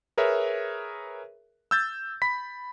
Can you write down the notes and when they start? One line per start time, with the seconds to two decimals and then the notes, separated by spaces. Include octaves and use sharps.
0.18 G#4 A#4 B4 C#5 E5
1.71 E6 G6 A6
2.22 B5 B6